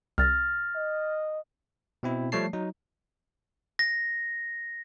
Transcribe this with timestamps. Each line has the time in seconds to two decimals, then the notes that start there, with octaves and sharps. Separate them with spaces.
0.18 C2 F6 A6 A#6
0.75 D#5
2.03 B2 C4 E4
2.32 F3 G3 A3 C#5 A5 C7
2.53 F#3 D#4
3.79 A#6